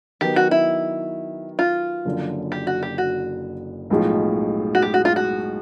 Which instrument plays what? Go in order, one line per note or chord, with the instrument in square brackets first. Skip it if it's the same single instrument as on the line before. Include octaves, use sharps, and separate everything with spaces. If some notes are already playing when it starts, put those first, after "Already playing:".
[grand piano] D#3 F#3 B3 [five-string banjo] G4
[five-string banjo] F#4
E4
F4
[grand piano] F#1 F#2 D3 F3
[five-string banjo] G4
F#4
G4
F#4
[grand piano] B1 A2 F3 G#3
[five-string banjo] F#4
G4
F#4
F4
F#4